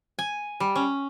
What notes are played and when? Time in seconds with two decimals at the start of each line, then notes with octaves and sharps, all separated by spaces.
0.19 G#5
0.60 G3
0.75 C#4